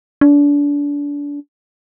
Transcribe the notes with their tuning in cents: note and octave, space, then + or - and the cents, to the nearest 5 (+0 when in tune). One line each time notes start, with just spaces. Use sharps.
D4 -30